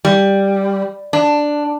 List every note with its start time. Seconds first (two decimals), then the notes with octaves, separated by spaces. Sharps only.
0.05 G3
1.13 D4